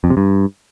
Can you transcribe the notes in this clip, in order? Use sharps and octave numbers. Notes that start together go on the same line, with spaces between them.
F2
C3
G2